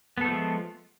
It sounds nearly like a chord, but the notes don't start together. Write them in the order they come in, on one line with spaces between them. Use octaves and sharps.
B3 A4 A3 F3 G#3